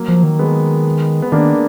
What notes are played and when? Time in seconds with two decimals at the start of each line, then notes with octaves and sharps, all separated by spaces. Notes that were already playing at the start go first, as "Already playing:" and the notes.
Already playing: F#3 A#3
0.08 F3
0.23 D#3
0.39 G#3 B3
1.22 B3
1.32 D#3 A#3 D4